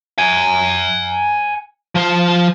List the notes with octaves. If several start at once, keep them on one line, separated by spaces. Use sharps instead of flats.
F#5 G#5
F3 C5